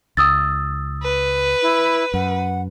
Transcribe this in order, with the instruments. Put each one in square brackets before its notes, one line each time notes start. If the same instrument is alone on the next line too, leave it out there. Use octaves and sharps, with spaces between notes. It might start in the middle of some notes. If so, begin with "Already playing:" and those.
[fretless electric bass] C#2 [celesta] D#6 E6 A6
[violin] B4
[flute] E4
[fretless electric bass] F#2 [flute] F#5